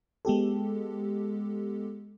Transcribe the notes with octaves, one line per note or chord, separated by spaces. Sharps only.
G#3 B3 G4 A4